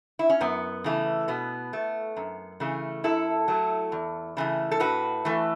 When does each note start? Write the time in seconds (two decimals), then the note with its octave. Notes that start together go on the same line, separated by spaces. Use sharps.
0.19 E4
0.30 C#4
0.41 F#2 B3
0.84 C#3 E3 A3
1.28 B2 B3
1.73 A3
2.17 F#2
2.60 C#3 E3 A3
3.04 F#2 E4 A4
3.48 F#3 A3
3.92 E2
4.37 C#3 E3 A3
4.71 A4
4.80 A2 F#4 B4
5.25 E3 A3